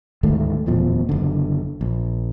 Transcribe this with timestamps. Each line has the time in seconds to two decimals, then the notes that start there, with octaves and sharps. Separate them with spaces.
0.23 D2 G#2 D#3 A3
0.66 D1 E2 A#2 F3
1.09 F#1 D3
1.81 A#1